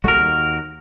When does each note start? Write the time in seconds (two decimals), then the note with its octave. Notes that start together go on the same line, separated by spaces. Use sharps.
0.04 C2 G3 A3 F#4 A#4
0.19 D#2